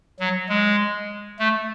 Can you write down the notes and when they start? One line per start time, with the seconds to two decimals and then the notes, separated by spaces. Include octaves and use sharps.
0.20 F#3
0.49 G#3
1.39 A3